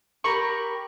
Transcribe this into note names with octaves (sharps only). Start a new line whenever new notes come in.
G4 A#4 B5 C#6